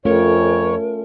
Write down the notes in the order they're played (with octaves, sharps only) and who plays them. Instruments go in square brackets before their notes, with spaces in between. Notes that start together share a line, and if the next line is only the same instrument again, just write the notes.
[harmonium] F2 C#5 [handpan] A3 C#4 F4 [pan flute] A#4